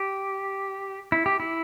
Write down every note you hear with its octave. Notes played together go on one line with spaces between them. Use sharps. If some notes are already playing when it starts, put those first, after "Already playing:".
Already playing: G4
E4
G4
E4